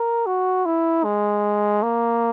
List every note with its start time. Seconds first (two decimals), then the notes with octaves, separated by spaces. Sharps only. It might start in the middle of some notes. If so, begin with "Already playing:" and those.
Already playing: A#4
0.26 F#4
0.65 E4
1.04 G#3
1.83 A#3